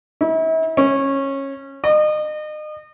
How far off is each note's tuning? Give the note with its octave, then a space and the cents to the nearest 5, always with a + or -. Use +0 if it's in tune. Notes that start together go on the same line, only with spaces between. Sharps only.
E4 -40
C#4 -20
D#5 -35